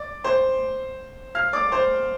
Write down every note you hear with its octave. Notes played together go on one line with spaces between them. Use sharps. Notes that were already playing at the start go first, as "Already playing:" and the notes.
Already playing: D5 D6
C5 C6
F5 F6
D5 D6
C5 C6